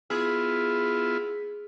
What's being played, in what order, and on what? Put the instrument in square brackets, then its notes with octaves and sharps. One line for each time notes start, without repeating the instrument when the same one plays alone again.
[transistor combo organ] B3 E4 F4 [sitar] G#4